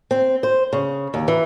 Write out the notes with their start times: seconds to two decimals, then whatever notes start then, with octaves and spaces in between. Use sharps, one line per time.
0.11 C4
0.43 C5
0.73 C#3
1.14 D#2
1.28 E3